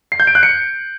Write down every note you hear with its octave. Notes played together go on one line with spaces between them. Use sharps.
C7
G6
D7
F#6
C#7